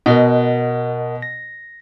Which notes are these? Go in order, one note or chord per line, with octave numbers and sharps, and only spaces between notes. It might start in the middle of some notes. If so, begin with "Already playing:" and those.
B2 A#4 D#5 F#5
A#6